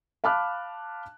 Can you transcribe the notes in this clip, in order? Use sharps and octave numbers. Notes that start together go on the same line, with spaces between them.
F5 A5 B5 D6 F6 F#6